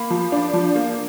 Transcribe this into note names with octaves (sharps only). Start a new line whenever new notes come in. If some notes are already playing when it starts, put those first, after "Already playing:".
Already playing: A#3 B5
F3
D4
F3
A#3